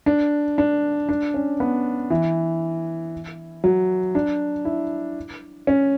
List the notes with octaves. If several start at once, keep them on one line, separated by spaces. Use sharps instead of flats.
D4
D4
D4
C#4
B3
E3
F#3
D4
E4
C#4